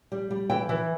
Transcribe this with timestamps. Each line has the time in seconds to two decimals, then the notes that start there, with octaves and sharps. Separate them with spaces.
0.12 G3
0.31 G3
0.50 E3 G5
0.69 E3